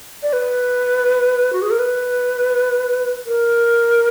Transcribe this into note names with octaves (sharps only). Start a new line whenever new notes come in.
D5
B4
F#4
G#4
A#4
B4
A#4